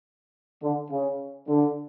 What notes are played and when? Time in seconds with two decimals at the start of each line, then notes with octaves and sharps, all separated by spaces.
0.63 D3
0.91 C#3
1.48 D3